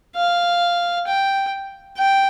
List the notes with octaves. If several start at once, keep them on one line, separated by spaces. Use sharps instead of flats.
F5
G5
G5